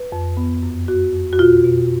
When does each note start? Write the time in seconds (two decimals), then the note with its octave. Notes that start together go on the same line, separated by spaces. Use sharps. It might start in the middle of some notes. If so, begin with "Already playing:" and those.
Already playing: B4
0.12 F2
0.37 B3
0.63 F#2
0.88 B3 F#4
1.13 F2
1.33 F#4
1.39 B2 F4
1.64 B2